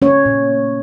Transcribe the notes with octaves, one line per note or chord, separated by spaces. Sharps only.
A3 C#4 C#5
A#2